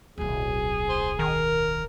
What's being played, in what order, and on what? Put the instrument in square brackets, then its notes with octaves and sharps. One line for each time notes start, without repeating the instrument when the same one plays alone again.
[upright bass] D1 B1 [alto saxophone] G#4
[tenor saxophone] C5
[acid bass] D#3 [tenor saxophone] A#4